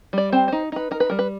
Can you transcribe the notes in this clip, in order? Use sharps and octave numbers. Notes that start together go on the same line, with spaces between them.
G3 D5
C4 C5
D#4 C5
D#4 B4
D#4 A#4
B4
G3 A#4
B4